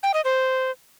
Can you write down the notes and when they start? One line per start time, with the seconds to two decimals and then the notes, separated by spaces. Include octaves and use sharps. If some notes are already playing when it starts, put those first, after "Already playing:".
0.03 G5
0.14 D#5
0.25 C5